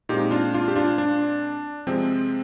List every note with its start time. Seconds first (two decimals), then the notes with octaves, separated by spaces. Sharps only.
0.09 A#2 G#3 C4 D#4 G4
0.31 D4 F4
0.54 D4 F4
0.68 G4
0.75 D4 F4
0.98 D4
1.87 C3 F3 G#3 C4